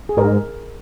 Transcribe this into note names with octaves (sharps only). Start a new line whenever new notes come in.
G#4
G#2 A#4